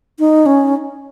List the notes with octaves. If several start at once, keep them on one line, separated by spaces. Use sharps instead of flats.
D#4
C#4